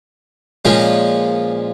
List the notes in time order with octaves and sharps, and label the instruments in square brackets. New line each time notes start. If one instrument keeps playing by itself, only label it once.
[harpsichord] A#2 F3 G#3 C#4